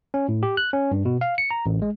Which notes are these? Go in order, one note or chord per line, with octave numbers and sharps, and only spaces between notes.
C#4
A2
G4
F#6
C#4
G2
B2
F5
C#7
A#5
A1
G#3